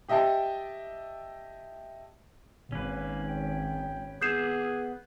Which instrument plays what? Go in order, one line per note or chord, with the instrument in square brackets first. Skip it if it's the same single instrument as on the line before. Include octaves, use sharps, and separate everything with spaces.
[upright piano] G4 D#5 E5 G5 A5
[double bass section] G#1 [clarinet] A#3 [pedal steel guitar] C#4 B4
[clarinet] G5
[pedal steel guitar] B3 [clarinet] G#4 [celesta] G6 C7 E7